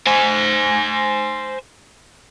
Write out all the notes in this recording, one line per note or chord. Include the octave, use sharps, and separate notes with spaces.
C5 G#5